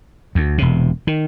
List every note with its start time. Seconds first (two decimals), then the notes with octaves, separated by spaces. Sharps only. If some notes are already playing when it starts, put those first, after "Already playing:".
0.35 D2
0.58 E1 C3
1.07 D#3